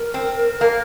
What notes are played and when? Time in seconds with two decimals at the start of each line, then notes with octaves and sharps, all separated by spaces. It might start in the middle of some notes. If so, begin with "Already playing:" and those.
Already playing: A#4
0.14 C4
0.61 A#3